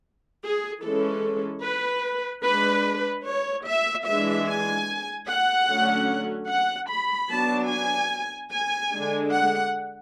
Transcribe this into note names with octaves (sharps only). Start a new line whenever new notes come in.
G#4
E3 G#3 C#4 A4
B4
G#3 D4 B4
C#5
E5
E3 G#3 D4 E5
G#5
F#5
D3 F#3 A3 C#4
F#5
B5
F#3 B3 D4 A5
G#5
G#5
D3 G#3 D4
F#5